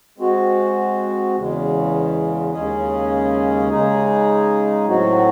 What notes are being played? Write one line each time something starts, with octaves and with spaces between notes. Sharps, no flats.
G#3 C4 F#4
E2 C#3 G#3
D#2 C#3 G#3 C#4 G#4
C#3 G#3 D#4 G#4
A2 F#3 C4 F#4